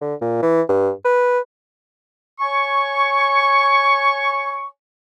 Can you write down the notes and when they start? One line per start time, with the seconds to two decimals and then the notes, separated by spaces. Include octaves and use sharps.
0.01 D3
0.21 A#2
0.42 E3
0.69 G2
1.04 B4
2.40 C#5 G#5 C#6